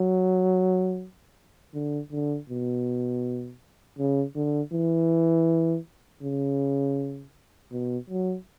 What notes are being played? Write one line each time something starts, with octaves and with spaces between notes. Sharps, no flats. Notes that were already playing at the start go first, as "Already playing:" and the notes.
Already playing: F#3
D3
D3
B2
C#3
D3
E3
C#3
B2
F#3